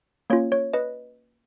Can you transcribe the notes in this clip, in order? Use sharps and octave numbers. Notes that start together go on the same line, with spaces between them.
A#3 C#4 F4 C#5
C#5
B4 D#5